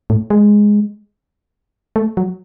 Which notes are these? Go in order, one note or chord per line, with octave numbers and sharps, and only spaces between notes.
A2
G#3
A3
F#3